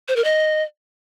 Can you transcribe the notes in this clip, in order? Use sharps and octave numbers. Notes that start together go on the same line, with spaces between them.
C5
A#4
D#5